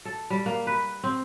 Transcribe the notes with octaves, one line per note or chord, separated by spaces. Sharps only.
A4
G3
A#3
B4
C4